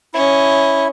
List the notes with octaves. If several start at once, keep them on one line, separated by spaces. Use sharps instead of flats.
C#4 E4 D#5